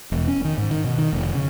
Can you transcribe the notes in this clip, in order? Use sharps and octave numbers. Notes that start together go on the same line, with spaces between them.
E1
C#4
D#3
G#2
D#3
B2
D#3
F1
C#3